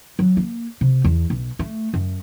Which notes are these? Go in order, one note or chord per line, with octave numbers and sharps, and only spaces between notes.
F#3
A#3
C3
E2
B1
A3
F#2